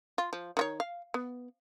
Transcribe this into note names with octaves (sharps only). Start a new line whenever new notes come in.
F4
F3
D#3 F4 C#5
F5
B3